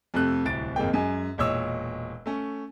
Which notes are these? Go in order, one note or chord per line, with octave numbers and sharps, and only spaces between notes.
F2 C3 A3 F#6
D1 C2 A6 D7
G#1 F2 G#3 A#3 G5
F#2 G#3 G#5
E1 A#2 C#5 D#5 E6
A3 C#4